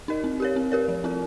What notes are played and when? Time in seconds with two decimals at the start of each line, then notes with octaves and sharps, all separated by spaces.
0.08 D#4 A#4 D#5
0.24 C4
0.40 G4 A#4 C#5
0.56 C4
0.72 G4 A#4 C#5
0.88 F3
1.04 C4 F4 A#4